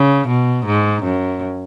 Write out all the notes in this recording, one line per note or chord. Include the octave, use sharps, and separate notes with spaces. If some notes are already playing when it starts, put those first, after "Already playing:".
Already playing: C#3
B2
G#2
F#2